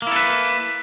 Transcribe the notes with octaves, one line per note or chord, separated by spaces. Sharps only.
A#3 E4 A4 B4